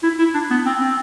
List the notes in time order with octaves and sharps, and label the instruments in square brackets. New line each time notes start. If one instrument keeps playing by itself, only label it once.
[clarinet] E4
E4
D4
B3
C4
C4